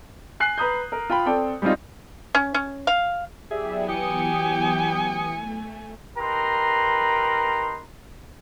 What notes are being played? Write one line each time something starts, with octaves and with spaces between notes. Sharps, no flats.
G#5 F#6 C7
B4 A#5 D#6 G6
A#4
F4 G5 B5
C4 A4 D5 G5
G3 G#3 C4 D#4 F4
C#4
C#4
F5
F#3 B3 E4 G4 G#4 D5 E5
E3 G4 G#5 D#6 C#7
A3
D#4 G4 A#4 B4 A#5 C6